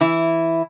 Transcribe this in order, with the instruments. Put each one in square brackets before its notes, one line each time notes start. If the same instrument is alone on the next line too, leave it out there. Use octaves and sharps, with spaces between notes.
[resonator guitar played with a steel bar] E3 E4